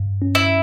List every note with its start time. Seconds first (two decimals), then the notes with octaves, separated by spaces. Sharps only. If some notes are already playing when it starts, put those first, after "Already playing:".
Already playing: G2
0.22 C#4
0.35 E4